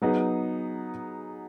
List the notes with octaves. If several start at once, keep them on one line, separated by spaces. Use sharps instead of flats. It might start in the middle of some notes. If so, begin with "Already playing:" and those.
F#3 B3 D#4 G#4